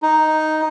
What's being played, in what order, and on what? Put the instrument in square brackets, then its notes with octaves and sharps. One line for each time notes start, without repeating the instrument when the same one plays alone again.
[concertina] D#4